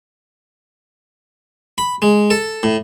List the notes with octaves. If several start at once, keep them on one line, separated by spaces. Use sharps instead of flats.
B5
G#3
A4
A2